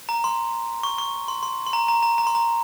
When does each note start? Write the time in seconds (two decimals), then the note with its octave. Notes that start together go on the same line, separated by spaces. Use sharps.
0.09 A#5
0.24 C6
0.83 C#6
0.98 C#6
1.28 C6
1.43 C6
1.67 C6
1.73 A#5
1.88 A#5
2.03 A#5
2.18 A#5
2.27 C6
2.35 A#5